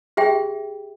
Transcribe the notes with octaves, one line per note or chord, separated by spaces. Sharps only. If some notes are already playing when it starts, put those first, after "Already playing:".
G4 G#4 E5 G5